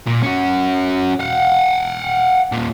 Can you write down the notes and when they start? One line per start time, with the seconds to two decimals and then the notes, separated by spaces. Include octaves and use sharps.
0.07 A#2
0.23 C#4 F#4
1.20 F5 F#5
2.52 D#2 A#2